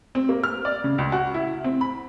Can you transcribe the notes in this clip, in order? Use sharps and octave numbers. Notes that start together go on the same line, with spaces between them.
C4
A#3
F6
D5
C#3
C#2
F#4
E4
C4
B5